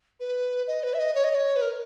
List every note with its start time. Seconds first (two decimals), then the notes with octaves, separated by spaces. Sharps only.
0.20 B4
0.67 D#5
0.83 B4
0.94 E5
0.99 D#5
1.15 C#5
1.24 D#5
1.35 C#5
1.56 B4
1.61 A#4